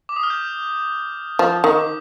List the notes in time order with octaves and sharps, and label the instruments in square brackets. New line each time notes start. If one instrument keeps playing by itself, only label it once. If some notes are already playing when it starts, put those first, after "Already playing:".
[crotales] D6
D#6
F6
G6
[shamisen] F3
D#3
[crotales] D6